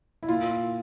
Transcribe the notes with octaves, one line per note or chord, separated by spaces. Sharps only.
E4
A#2 F4